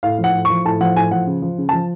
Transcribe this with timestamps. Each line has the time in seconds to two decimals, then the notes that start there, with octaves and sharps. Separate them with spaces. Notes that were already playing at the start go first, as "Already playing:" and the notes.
0.03 A2 F5
0.19 F3
0.24 F#5
0.34 A2
0.45 C#6
0.50 F3
0.65 A2 A5
0.81 F3 F#5
0.96 A2 G#5
1.11 F3 F#5
1.27 C#3
1.42 F3
1.58 C#3
1.69 F3 A5